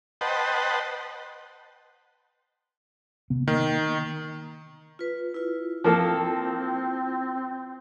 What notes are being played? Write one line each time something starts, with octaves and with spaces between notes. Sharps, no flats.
B4 C5 D#5 F#5 G5 A5
C3 B3
D#3 A#3
F4 B4
E4 F4
F3 A#3 C4 A4